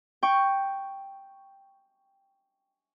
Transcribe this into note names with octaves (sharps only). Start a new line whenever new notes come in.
G5 C#6